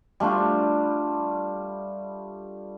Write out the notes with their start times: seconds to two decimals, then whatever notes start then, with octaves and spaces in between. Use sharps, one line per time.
0.20 G3 A3 D4 F4